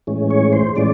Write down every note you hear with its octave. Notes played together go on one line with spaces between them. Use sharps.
A2 E3 G#3 C#4
C#5
C5
A2 E3 G#3 C#4 D5